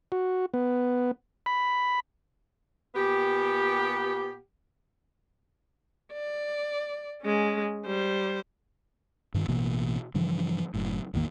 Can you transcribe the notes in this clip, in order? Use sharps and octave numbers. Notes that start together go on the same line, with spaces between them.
F#4
B3
B5
A#2 B3 G4
D5
G#3 C#4
G3 C5
G2 D#3
A1 B2 E3 A#3
G2 C#3 E3 F3
F#1 F#2 A2
A1 E2 D#3 A#3